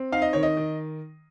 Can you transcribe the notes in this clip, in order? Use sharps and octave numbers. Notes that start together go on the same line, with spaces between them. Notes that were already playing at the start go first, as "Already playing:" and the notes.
Already playing: C4
D#4 F5
D#5
D#3 C#5
D#5
D#3